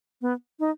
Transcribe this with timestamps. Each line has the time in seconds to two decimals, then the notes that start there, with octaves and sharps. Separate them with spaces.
0.22 B3
0.60 D#4